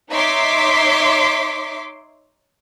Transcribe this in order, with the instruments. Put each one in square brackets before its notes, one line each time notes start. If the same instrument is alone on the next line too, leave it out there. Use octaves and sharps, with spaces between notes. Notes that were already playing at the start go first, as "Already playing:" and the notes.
[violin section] D#4 C#5 E5 C6 D6 B6